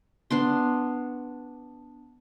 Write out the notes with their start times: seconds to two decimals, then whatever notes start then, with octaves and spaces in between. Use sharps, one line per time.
0.31 B3 D4 C6